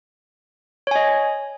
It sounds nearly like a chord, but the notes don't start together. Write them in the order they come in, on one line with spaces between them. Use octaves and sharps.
C#5 G#5 D#5